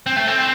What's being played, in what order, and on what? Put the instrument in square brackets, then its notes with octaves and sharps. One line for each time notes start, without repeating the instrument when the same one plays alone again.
[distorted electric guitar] C4
A3
C4